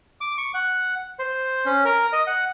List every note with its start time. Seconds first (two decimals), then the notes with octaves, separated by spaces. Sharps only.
0.21 D6
0.38 C#6
0.54 F#5
1.19 C5
1.66 C#4
1.85 A#4
2.13 D#5
2.27 F#5